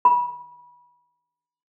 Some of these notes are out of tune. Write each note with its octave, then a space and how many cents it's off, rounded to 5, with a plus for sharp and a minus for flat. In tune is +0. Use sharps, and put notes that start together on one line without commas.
B5 -25